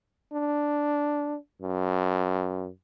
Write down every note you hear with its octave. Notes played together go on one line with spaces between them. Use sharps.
D4
F#2